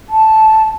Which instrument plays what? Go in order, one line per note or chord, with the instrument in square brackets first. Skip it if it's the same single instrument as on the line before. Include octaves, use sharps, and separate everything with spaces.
[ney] A5